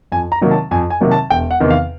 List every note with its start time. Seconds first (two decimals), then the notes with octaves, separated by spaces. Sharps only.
0.12 F2 G#5
0.32 A#5
0.41 C3 D#3 F#3 A#3
0.51 A5
0.71 F2 G#5
0.90 G#5
1.01 C3 D#3 F#3 A#3
1.11 A5
1.30 E1 G5
1.51 F#5
1.60 E2 C3 D#3
1.70 F5